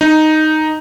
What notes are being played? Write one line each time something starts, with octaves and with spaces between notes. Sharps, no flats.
D#4